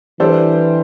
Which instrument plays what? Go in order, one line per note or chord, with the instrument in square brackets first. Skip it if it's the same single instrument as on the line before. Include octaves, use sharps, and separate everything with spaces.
[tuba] E3 [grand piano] G3 D4 A4 C5